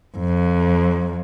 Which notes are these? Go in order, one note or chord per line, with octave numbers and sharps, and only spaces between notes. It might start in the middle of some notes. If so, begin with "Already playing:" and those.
F2